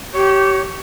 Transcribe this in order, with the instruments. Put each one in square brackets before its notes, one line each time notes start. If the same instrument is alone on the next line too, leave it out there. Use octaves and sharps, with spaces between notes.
[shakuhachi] G4 [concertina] C#5